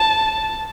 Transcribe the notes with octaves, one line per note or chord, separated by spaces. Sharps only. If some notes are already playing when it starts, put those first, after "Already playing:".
Already playing: A5